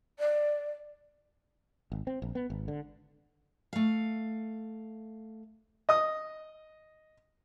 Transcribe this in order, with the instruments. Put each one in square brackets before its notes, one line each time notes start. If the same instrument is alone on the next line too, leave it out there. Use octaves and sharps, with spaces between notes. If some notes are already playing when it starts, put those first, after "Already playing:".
[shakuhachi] D5
[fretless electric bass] G#1
C4
A#1
B3
G#1
D3
[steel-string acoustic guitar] A3 F5
[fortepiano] D#5 D#6